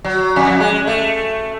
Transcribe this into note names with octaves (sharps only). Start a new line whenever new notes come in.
F#3
F2
G#3
A3